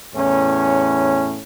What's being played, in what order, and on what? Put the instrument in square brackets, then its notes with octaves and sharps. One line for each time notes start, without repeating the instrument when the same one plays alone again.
[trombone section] E2 A2 C#4